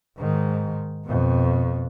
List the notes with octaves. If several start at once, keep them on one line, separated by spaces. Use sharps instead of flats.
G#2 D#3
F2 B2